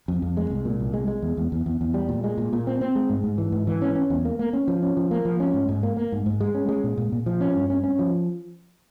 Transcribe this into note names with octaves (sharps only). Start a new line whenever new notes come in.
F2
F2
G#3
C2
A#2
C2
G#3
G#3
E2
E2
E2
E2
E2
G3
A#2
G#3
A#2
A#2
C4
C4
G#3
G#2
G#2
E3
G#2
E3
C#4
C#4
E2
A#3
A#3
C#4
F3
C#4
F3
A#3
F3
C#4
G#2
G#2
A#3
A#3
G#2
G#2
G#3
C#4
G#3
A#2
A#2
A#2
F3
C#4
G2
C#4
C#4
F3